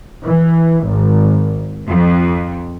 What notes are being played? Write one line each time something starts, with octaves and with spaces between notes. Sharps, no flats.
E3
G#1
F2